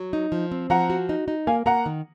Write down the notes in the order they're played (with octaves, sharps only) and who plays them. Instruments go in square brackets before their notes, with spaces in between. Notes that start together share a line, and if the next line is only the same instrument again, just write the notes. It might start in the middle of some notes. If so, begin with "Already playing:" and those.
Already playing: [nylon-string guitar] F#3
D#4
F3
C4
[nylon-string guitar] F3 [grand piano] F#5 A#5
[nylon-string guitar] F#4
D#4
D#4
[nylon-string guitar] A#3 [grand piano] F5 G#5
[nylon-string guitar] A#3 [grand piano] F#5 A#5
[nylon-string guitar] D#3